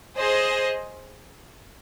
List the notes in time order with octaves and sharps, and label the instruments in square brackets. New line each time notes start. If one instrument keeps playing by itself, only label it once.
[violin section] G#4 C5 D#5